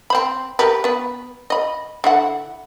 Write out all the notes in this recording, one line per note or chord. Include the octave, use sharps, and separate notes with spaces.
C4 C5 B5
G4 A#4 B4
B3 B4
D#5 B5
D3 E4 F#5